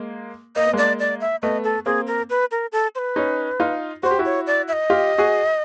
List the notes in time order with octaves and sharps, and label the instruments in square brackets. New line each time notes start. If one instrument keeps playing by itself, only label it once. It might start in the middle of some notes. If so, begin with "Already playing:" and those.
Already playing: [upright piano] G#3 A#3
[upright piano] A#3 [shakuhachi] D#5
[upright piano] B3
[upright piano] G#3 A#3 [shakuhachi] D5
[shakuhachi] D5
E5
[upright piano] A3 B3 [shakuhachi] D#5
[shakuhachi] A4
[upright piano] A#3 C4 [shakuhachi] G#4
[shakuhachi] A#4
B4
A#4
A4
C5
B4
[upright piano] C#4 D#4
D#4 F4
[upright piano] F#4 [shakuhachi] C5
[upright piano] G4
E4 F#4
[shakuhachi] C#5
D5
E5
D#5
[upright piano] F4 G4
F#4 G#4